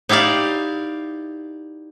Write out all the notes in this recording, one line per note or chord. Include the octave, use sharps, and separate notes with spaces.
D#4 E4 G4 D5 F5